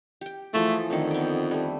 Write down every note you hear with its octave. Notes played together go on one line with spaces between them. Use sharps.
G4 G5
E3 F3 A3 G#4
F2 D3 D#3
B3 G5
G3 A3